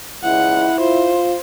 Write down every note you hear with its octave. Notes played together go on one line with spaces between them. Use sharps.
C#2 E4 F#5
F4 C5